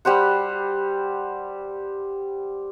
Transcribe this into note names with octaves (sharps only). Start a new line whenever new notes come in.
G3 G4 C5 F#5